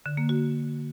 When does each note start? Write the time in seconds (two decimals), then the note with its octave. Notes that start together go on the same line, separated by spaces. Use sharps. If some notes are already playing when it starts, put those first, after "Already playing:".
0.06 D3
0.17 A#3
0.29 F#4